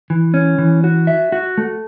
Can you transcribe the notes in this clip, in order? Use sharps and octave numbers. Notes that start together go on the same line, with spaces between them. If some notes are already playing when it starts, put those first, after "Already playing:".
E3
C#4
E3
F#4
E5
F#4
A3